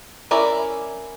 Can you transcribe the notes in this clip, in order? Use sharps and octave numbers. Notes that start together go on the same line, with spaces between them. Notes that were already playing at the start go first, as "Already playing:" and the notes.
C#4 E4 A#4 D5